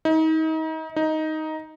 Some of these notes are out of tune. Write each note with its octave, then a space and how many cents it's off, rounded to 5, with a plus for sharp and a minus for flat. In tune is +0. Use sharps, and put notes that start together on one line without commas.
D#4 +35
D#4 +10